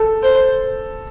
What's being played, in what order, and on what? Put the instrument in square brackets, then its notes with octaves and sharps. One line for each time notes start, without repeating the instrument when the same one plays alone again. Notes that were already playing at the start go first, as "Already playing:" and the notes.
Already playing: [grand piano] A4
[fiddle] C5